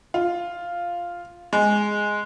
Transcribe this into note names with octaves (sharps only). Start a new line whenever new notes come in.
F4
G#3